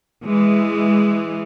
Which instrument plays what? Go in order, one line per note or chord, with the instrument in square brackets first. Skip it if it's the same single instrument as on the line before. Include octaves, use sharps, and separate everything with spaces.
[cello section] E3 G#3